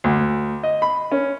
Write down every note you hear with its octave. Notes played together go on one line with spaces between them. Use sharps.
D2
D#5
B5
C#4